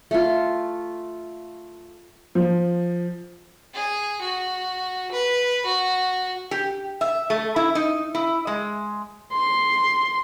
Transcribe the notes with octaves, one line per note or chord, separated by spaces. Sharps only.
A3 F4
F3
G#4
F#4
B4
F#4
G4
E5
A3
E4
D#4
E4
G#3
C6